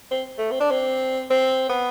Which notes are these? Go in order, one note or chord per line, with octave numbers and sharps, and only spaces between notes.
C4
A3
C4
D4
C4
C4
B3